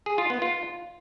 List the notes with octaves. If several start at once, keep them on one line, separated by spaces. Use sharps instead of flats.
G#4
F4
B3
F4